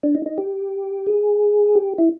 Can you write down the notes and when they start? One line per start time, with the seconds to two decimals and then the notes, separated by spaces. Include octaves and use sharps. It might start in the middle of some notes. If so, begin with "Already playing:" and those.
0.03 D4
0.15 D#4
0.26 D#4
0.38 G4
1.07 G#4
1.75 G4
1.98 E4